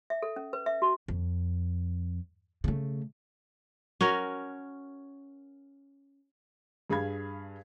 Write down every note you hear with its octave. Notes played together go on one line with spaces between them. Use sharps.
E5
A4
C#4
B4
E5
F#4
F2
C#3 A3
C#4 F#4 A#4
G2 G#4 F5 B5 G#6